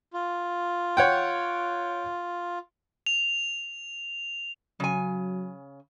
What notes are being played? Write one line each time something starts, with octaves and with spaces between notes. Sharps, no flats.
F4
C#5 F#5 G5
F7
C#3 F#3 G#5